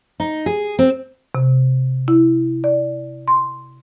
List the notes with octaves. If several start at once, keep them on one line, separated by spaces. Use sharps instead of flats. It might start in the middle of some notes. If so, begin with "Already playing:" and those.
D#4
G#4
C4
C3
E4
D5
C6